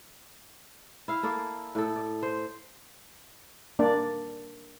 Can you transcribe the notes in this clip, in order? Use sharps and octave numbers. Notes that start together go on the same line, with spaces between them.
E4 F5
A#3 A4 D5
A2 A4
D5
C5
A#3 D4 D5